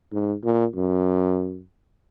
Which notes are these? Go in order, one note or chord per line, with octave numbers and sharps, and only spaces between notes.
G#2
A#2
F#2